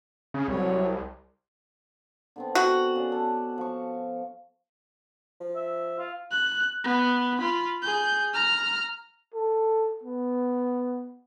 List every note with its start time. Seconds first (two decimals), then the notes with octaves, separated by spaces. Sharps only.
0.34 C#3
0.48 C2 F#3 C#5
2.36 D3 B3 C4
2.55 F#4
2.96 C#3 D5
3.12 A4 D5
3.58 F3 C#6
5.40 F3
5.56 E5
5.99 F4
6.31 F#6
6.84 B3
7.38 F4 B5
7.82 G#4 G6
8.34 A#5 F6
9.34 A4
10.03 B3